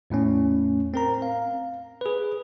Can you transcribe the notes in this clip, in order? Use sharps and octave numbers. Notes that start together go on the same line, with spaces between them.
E2 A2 A3 C#4
C4 A#4 A#5
F5
G#4 B4